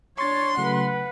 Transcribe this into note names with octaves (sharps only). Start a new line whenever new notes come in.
D4 C#5 C6 C#6 A6
C#3 F#3 A3 B4 F#5